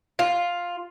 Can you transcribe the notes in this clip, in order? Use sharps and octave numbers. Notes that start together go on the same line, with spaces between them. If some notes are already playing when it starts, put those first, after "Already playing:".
F4